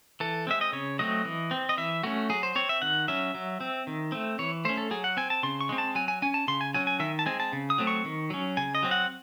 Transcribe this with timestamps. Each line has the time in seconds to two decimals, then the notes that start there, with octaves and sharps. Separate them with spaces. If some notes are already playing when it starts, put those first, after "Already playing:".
0.20 E3 A4
0.47 G#3 C4 E5
0.61 D#5
0.72 C#3 C#5
0.99 F#3 A3 C4 D#5
1.25 E3
1.51 C4
1.69 D#5
1.77 E3 E5
2.03 A3 C#4 F#4
2.30 F#3 G#4
2.43 C5
2.55 C4 C#5
2.69 E5
2.82 D#3 F#5
3.08 F#3 C#4 E5
3.35 F#3
3.60 C4
3.87 D#3
4.12 A3 C4
4.39 E3 C#5
4.65 A3 C#4 C5
4.78 A4
4.91 F#3 G#4
5.04 F#5
5.17 C4 G#5
5.30 A5
5.43 C#3 C6
5.61 C#6
5.69 G#3 C4
5.78 A5
5.95 F#3 G#5
6.08 G#5
6.22 C#4 G#5
6.34 A5
6.48 C#3 C6
6.61 G#5
6.74 F#3 C#4 G#5
6.87 G#5
6.99 D#3 E5
7.19 A5
7.26 G#3 C4 G#5
7.40 A5
7.53 C#3
7.70 D#6
7.78 F#3 A3 C4
7.87 C#6
8.05 D#3
8.30 F#3 C#4
8.57 C#3 G#5
8.75 D#5
8.83 F#3 C4
8.91 F#5